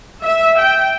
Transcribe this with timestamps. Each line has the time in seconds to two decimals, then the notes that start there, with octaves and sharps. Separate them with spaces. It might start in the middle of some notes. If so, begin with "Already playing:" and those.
0.23 E5
0.58 G5